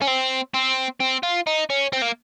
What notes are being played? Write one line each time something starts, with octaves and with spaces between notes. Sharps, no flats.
C#4
C4
C4
C4
F4
D#4
C#4
C4
A#3